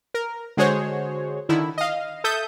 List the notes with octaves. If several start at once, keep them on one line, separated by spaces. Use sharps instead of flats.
A#4
D3 G#3 F#4 G#4 C5 C#5
D3 D#3 E4
D#5 F5
A4 E5 D#6 G6